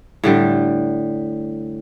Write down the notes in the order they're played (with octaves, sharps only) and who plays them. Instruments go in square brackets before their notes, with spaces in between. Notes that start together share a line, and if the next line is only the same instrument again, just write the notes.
[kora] A2 D3 G3